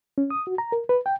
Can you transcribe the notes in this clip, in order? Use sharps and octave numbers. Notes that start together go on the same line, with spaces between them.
C#4
D#6
F#4
A#5
A#4
B4
G5